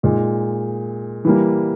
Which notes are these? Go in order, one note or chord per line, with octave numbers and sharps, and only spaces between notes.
A#2 G#3 D#4
E3 G3 A#3